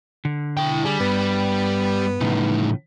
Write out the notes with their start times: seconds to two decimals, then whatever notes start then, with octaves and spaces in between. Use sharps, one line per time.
0.25 D3
0.57 E4 G5
0.84 G3 G#4
1.00 G2 B3
2.21 A2 C#3 E3 F3 D#4